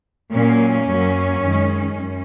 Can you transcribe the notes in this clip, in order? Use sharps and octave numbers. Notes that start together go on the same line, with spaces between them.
A#2 F#3 A#3 C#4
F#2 F#3 A#3
F#2 D#3 G#3
F#2